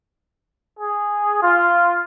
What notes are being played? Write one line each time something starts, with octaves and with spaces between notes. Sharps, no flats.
G#4
F4